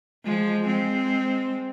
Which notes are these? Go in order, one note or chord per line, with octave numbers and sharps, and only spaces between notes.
F3 G#3
G#3 C4